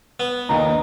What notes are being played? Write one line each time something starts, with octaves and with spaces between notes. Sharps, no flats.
B3
A#1 D#2 D#5 A#5